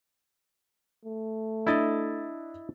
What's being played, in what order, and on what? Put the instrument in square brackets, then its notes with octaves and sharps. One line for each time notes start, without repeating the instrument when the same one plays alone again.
[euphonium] A3
[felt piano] D4 A6 [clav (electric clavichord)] E4 D#5